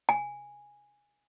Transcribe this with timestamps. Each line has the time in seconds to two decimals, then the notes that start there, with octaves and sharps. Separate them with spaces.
0.09 G#5